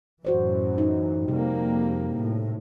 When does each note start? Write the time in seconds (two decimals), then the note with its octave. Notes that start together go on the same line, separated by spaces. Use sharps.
0.25 F#2 A2 E3 F#4 C5 D5
0.78 D#4
1.28 F2 C3 G3 A#3
2.14 A2